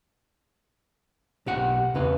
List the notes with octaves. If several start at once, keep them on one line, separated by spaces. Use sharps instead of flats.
B1 G4 F#5
E2 C#3 B4